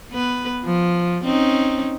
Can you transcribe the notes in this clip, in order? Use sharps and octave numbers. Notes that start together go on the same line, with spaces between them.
B3 B4
F3
C4 C#4 D#4